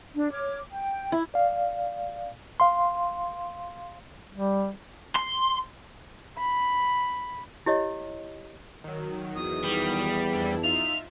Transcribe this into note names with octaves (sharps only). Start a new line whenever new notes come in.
D4
C#5 D6 F6
G5
E4
D5 F5
F5 C6
G3
C6
B5
E4 G4 C#5 D#5
D#3 F#3
E2 D#6
G3
F2 D4 E4
D#4 F4 E5 F7